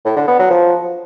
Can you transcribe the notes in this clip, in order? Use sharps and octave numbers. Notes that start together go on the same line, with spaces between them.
A2
D3
B3
F#3
F3